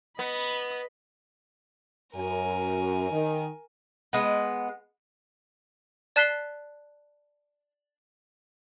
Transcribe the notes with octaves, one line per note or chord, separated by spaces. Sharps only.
B3 D#5 B5
F#2 A#4 G#5
D#3
G#3 B3
D5 A5 F#6 B6 C7 G7